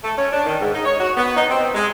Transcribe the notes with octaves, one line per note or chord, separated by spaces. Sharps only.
A3
C#4
D4
D#3
G#2
D#4
C#5
F#4
B3
D#4
C4
G#3